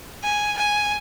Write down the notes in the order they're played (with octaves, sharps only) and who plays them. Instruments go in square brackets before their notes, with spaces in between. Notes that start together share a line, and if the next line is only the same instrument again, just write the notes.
[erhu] G#5
G#5